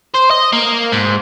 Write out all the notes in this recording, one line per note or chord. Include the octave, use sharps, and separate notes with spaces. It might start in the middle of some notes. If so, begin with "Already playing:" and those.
C5
D#5
A#3
G#2